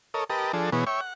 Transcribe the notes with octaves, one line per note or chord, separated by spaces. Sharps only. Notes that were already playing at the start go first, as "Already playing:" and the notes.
A4 A#4 C#5 D#5
G4 A#4 B4 D#5 A5
F3 D4 G#4 A4
B2 E3 B3 G#4 C#5
C#5 E5 G5 C#6
F#5